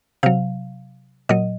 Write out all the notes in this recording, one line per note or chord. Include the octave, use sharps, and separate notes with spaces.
C3 F#3 F5
A#2 F#3 D#5